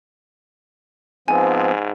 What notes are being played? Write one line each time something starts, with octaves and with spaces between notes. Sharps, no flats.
G#2 F3 B3 C4 G#5